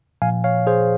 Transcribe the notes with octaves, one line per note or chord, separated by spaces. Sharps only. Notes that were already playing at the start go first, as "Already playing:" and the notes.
A#2 F3 F5 G#5
C#5 F5
G#4 C5